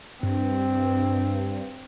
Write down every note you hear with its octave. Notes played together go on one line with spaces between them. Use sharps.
G2 C4